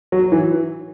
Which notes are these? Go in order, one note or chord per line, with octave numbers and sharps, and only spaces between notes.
F#3
E3